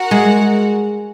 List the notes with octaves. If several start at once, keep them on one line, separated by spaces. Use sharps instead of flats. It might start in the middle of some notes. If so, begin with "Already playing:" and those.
Already playing: F#4 A#4 F#5
G#3